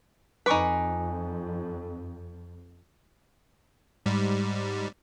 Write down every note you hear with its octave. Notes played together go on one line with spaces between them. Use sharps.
F2 D#4 B4 G#5 C#6 D6
G#2 G3